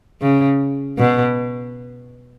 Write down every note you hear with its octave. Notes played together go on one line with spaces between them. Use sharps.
C#3
B2